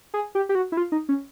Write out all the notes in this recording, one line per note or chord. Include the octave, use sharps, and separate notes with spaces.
G#4
G4
G4
F#4
E4
F4
D#4
C#4